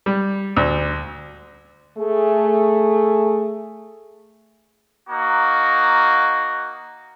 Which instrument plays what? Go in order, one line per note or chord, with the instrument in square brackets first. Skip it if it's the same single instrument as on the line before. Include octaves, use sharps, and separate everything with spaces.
[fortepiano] G3
D2
[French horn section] A3 G#4
[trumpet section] A#3 D#4 F#4